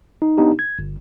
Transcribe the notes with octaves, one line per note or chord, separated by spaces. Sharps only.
D#4
B3 D4 D#4 G4
G#6
G1